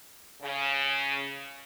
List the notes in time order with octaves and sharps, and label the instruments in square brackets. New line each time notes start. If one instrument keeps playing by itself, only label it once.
[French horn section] C#3